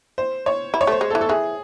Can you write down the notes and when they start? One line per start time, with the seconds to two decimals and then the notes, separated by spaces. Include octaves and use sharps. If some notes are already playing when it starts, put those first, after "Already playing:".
0.18 C5
0.46 C#5
0.74 E4
0.81 C#5
0.87 A3 C5
1.01 G#3
1.10 A4
1.15 E3
1.21 A4
1.29 E3 G#4